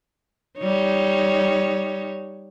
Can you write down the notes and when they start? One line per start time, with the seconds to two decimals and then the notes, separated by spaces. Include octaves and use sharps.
0.58 G3 D#4 C#5